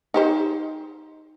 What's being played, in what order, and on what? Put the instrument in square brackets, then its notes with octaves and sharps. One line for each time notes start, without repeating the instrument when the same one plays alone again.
[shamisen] D#4 G4 C5